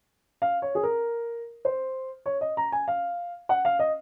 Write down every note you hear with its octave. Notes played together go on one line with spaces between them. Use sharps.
F5
C#5
G#4
A#4
C5
C#5
D#5
A#5
G#5
F5
F#5
F5
D#5